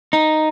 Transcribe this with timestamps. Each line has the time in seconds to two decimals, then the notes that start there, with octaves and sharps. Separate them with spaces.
0.13 D#4